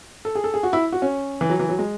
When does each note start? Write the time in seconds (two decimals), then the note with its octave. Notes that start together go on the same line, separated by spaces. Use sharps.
0.25 A4
0.35 G#4
0.44 A4
0.54 G#4
0.63 F#4
0.73 E4
0.92 F#4
1.02 C#4
1.41 E3
1.50 F#3
1.59 E3
1.69 F#3
1.79 G#3